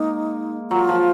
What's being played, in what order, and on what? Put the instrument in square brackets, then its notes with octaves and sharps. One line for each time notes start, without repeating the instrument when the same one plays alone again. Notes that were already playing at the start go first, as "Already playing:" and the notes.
Already playing: [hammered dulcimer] G#3 A#3 [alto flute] D#4
[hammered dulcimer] F#3 [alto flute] F4
[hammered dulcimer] F3